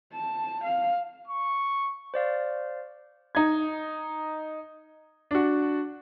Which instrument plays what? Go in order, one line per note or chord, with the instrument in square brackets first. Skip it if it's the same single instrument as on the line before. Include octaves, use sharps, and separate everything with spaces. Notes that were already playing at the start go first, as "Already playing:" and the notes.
[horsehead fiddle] A5
F5
[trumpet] C#6
[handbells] C5 D5 F5 A6
[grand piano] D#4 G#6
D4 F#4